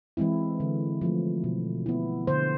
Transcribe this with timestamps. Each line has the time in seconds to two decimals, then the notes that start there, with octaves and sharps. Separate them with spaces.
0.17 E3 G#3 C4 E4
0.60 D3
1.01 F3 A3
1.44 B2
1.86 B3 E4
2.27 D3 C5